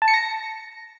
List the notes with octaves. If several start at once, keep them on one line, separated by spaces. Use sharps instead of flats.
A5
C#7
A#6